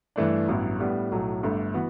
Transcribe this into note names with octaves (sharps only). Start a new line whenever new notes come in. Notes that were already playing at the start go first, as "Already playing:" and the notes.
G2 E3 A3 D4
A1 G2 F#3 B3 E4
A2 G3 B3 D4
B1 A2 F#3 A3
G1 G2 D3 A3
E3 B3 F#4